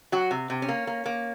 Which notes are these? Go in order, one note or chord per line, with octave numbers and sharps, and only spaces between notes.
F#3 F#4
C3
C3
C#4
A#3
A#3
A#3